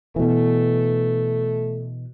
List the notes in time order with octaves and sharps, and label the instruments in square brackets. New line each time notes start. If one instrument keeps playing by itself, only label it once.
[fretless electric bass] B2 E3 [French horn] A3